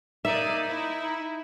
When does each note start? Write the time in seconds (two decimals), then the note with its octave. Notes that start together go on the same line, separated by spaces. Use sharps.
0.25 A#3 D#4 D5 E5 D#6
0.68 E4